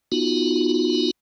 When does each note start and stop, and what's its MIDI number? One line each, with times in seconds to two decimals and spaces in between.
0.12 1.11 59
0.12 1.11 63
0.12 1.11 65
0.12 1.11 66